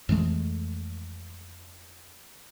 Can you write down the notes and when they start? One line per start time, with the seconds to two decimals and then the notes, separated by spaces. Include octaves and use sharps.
0.09 F2 E3 G#3 A3